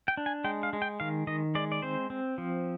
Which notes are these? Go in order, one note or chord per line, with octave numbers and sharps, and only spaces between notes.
G5
D4
G#5
G#3 G5
F5
G#3
G5
D#3 F5
D#3 D#5
G#3 D5
D5
C4 C5
C4
F3